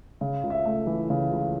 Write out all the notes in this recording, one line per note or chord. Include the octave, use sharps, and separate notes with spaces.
C#3
C#2
E5
A3
E3
C#3
C#2